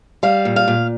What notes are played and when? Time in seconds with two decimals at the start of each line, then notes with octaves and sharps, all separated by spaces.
0.23 G3 F5
0.45 A#2
0.56 F5
0.68 A#2